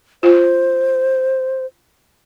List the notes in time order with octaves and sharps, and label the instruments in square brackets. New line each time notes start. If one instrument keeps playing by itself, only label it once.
[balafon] F4 [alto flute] C5